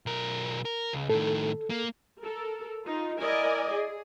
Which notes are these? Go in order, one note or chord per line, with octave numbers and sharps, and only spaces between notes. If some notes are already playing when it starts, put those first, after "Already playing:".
B1 A#4
A#4
C#2
A2 D#3 A4
A#3
A4 A#4
D#4 F4
E4 A#4 D5 D#5 G#5
G#4